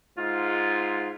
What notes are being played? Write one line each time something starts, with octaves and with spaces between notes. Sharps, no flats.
G#2 F4